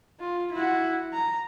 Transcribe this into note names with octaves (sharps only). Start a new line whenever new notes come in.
F4
E4 F#4
A#5